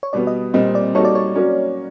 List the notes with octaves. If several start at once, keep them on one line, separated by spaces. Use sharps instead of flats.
C#5
B2 G3 B3 D5
D#5
A#2 G3 C4 D#5
D5
G3 A#3 D#4 F#4 A4 C#5
D5
C#5
F#3 A#3 C#4 F#4